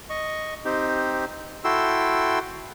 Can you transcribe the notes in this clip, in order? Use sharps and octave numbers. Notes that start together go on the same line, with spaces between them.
D#5 C#6
C4 D#4 G4
E4 F#4 A4 G5 C6 E6